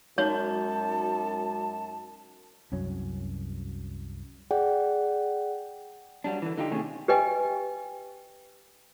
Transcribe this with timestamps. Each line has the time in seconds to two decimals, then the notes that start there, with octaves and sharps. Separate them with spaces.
0.18 F#2 G#3 D#4 F#4 C#5 A5
2.72 C2 F#2 F#3 C#4
4.51 G#4 D5 F#5 G5
6.24 F#3 G3 D4
6.42 D3 E3
6.58 D3 D#4 F4 G4
6.71 C3 D#3 A3 C#4 G4 G#4
7.08 G4 B4 D#5 G5 G#5